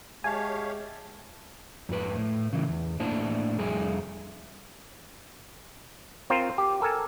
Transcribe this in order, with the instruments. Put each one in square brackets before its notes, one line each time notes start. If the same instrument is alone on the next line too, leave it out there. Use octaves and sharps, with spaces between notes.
[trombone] G#3 [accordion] G4 C#5 F5 [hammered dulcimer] E5 A5 [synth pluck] G#5
[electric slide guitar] F2 G#2 F4 B4
A2
C#3 E3
E2
A2 A#3 D4 E4 C5 A5
F2 G3 G#4 E5 G#5
[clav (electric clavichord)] C4 F4 A#4 C5
G4
A4 A#4 G#5 A5